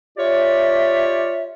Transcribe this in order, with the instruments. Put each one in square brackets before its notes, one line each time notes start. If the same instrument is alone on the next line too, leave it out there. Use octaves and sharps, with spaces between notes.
[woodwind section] F4 G4 C#5 D5 E5